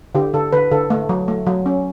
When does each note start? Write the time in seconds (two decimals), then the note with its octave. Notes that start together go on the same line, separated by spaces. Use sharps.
0.15 D3 G4
0.34 D3 A4
0.53 D3 B4
0.71 D3 A4
0.90 A3
1.09 F#3
1.28 A3
1.46 F#3
1.66 C#4